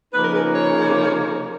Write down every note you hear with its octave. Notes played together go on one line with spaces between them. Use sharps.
C#3 F3 A#3 D#4 B4
A#4
G#4 B4
A#4 C#5